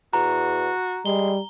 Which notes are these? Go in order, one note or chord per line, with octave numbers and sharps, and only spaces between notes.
E2 F#4 A#5
G3 G#3 G7